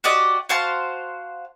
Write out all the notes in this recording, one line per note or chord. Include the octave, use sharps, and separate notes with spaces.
F#4 G4 D5 D#5
F#4 C5 F5 A5